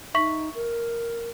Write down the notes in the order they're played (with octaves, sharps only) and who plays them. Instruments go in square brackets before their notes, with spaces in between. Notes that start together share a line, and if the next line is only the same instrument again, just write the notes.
[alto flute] D#4 [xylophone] E5 C#6 B6
[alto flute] A#4